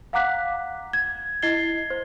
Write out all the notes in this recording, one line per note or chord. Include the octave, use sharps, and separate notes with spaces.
F5 F#5 A#5 D6 F#6 B6
G#6
E4 D#5 G#6 A6 C7 G7
C5